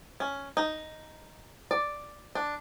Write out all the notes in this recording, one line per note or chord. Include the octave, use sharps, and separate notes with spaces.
C#4
D#4
D5
D4